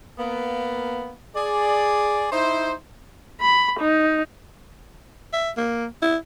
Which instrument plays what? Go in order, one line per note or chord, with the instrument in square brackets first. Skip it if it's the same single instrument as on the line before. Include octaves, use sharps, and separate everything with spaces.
[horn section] A#3 B3
G#4 D5
D#4 E4 C5
[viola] B5
D#4
[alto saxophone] E5
A#3
E4